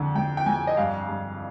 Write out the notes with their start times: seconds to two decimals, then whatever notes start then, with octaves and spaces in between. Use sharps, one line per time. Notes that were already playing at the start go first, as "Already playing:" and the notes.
Already playing: F2 D3
0.15 F2 G5
0.37 G5
0.46 F2 G#5
0.67 D#5
0.77 G2 F5
1.08 G2